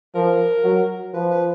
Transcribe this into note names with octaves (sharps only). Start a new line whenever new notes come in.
F3 A#4
F#3
F3 B4
B4